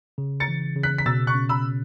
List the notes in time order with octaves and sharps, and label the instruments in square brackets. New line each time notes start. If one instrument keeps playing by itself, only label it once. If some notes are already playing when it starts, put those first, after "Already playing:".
[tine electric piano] C#3
[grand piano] A6 C#7
[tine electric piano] E3
C#3
[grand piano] F#6 B6
B6
[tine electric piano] B2 [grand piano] E6 A6
[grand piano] C#6 F#6
[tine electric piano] C#4
[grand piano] B5 E6